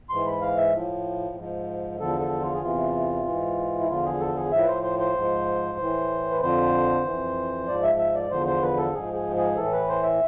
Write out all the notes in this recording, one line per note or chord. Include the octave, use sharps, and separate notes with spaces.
G#2 E3 C6
B5
F5
E5
A2 F3
G#2 F3
E2 D3 F3 A4
A4
F4
G#4
E2 C3 E3 F4
G#2 E3
E4
E2 D3 F3 F4
G#4
A4
G#4
A2 F3 E5
B4
C5
C5
C5
G#2 F3
A2 E3
B4
F2 D3 F3 C5
F2 E3
G#2 F3 D5
E5
E5
D5
E2 D3 F3 C5
C5
B4
A4
G#2 F3 G#4
G#4
G#4
A2 E3 A4
B4
C5
E5